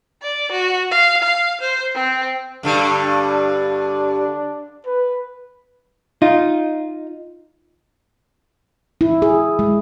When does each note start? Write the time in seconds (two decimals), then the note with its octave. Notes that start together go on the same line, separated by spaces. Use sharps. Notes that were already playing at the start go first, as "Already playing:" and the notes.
0.23 D5
0.52 F#4
0.91 F5
1.23 F5
1.61 C5
1.94 C4
2.63 G2 D3 G3
3.01 D4
4.86 B4
6.22 D#4 F4
9.01 E4
9.22 G#4
9.59 G#3